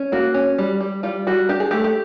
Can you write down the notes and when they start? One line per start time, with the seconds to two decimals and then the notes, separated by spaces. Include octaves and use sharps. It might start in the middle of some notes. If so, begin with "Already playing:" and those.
Already playing: C#4
0.12 A#3 F#4
0.34 C#4
0.58 G3
0.80 G3
1.03 G3 F4
1.27 G3 F#4
1.49 D4 G4
1.60 G#4
1.71 A3 G4
1.84 G4